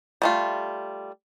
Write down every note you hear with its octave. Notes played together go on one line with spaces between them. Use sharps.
G3 A3 F4